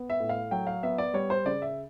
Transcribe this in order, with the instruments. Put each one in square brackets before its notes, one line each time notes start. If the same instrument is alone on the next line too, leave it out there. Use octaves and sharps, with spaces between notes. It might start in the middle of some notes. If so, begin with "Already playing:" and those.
Already playing: [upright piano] B3
E5
A2
F5
F#3 G5
F5
B3 E5
D5
G3 C#5
C5
C#3 D5
E5